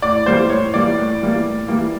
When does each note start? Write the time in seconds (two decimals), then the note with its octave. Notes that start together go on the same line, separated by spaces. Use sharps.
0.02 A2 D5
0.26 E3 G3 A#3 C5
0.50 A2 C#5
0.74 E3 G3 A#3 D5
0.98 A2
1.21 E3 G3 A#3
1.45 A2
1.68 E3 G3 A#3